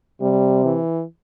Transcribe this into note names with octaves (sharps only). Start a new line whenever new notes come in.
C3 G3
E3